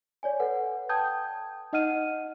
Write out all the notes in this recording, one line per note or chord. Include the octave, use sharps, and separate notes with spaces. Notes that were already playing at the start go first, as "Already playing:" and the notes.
C#5 D5 G#5
A4 B4 F#5
G5 A5 D#6 G6 G#6
D#4 D#5 F#5 F6 D#7